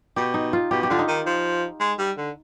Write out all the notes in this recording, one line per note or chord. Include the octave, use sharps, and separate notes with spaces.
B2 G4
D#4
F4
B2 G4
G4
D3 F4
D#4
D#3
F3
G#3
G3
D3